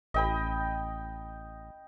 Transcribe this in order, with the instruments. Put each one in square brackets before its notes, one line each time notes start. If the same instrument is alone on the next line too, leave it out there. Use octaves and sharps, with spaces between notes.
[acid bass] A1 [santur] D#5 G5 B5